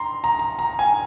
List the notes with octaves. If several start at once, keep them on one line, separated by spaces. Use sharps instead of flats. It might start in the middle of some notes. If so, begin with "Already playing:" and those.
Already playing: A#5 C6
A#5
A#5
A#5
G#5